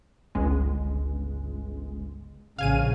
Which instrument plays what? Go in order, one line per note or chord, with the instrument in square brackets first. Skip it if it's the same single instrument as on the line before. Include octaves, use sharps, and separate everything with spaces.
[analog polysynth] G1 C#2 G#3
[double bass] A#1 C#3 [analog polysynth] F5 G#5 D#7